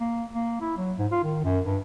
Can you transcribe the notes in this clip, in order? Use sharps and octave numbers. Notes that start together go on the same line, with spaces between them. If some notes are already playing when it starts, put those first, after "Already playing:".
A#3
A#3
E4
F#3
G#2
F4
D#3
F#2
G2